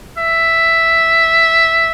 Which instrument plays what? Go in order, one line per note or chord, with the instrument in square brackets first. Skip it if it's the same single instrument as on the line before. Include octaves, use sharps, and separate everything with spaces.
[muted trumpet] E5